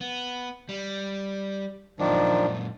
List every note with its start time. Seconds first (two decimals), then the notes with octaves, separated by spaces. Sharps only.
0.01 B3
0.69 G3
1.99 F#2 A#2 D#3 F3 D4